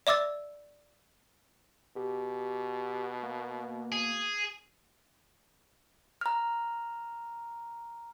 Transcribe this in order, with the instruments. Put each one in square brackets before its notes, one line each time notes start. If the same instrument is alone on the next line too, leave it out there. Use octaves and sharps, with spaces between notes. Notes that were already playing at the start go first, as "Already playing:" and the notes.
[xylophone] D5 E5 D6 E6 A6
[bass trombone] B2 [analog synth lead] G4
[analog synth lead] A#3
[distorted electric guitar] G#4
[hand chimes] A#5 F6